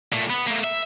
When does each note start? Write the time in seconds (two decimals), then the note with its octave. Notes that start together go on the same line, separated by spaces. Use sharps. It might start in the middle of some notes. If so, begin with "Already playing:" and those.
0.13 A#2 A3
0.30 B3
0.47 A3 A#3
0.64 E5